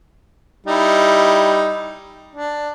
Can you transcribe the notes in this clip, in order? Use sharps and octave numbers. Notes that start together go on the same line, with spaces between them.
G3 D#4 E4
D4